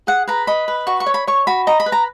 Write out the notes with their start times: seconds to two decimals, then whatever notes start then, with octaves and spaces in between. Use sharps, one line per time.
0.07 G#4 F#5
0.28 B4 A#5
0.47 D#5 B5
0.68 B4
0.87 F#4 C#6
1.00 C#6
1.06 C#5
1.14 B5
1.27 C#5 C#6
1.47 F#4 B5
1.67 D#5 A#5
1.80 B5
1.86 B4
1.92 A#5